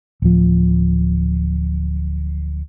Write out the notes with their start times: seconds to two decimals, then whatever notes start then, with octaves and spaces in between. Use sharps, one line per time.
0.22 D1 F3